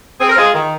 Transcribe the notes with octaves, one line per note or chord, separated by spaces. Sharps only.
C4 G#4
A#4
G#3 F4 G#4
D#3